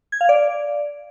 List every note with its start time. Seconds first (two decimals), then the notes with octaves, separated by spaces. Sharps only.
0.12 G#6
0.21 F5
0.29 D5